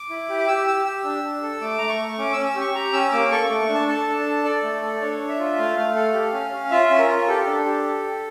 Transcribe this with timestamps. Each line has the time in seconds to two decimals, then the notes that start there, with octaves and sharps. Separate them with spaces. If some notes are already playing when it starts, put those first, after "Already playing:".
Already playing: D6
0.10 E4
0.29 G4
0.40 D6
0.48 G4 E6
0.67 G4 E6
0.85 G4 E6
1.04 D4
1.24 D4
1.43 A4
1.61 A3 D6
1.78 A3 A#5
1.89 C#6
1.99 A3
2.18 C#4 D6
2.33 C#4 E6
2.46 E6
2.55 G4
2.61 C#6
2.74 G4 A#5
2.93 C#4 E6
3.12 A#3 D6
3.31 A4 C#6
3.46 A3 D6
3.60 C#6
3.68 D4
3.74 A5
3.87 A4 A5
4.07 D4
4.26 A4
4.45 A4 D5
4.63 A3
4.82 A4
5.01 D4 C#5
5.19 D4
5.29 E5
5.39 F4
5.58 A3 F5
5.76 A3 F5
5.95 A4 F5
6.14 G4
6.33 C#4
6.53 C#4
6.71 F4 E5
6.90 C#4
6.99 A#4
7.08 F4
7.27 G4 A4
7.46 D4
7.66 G4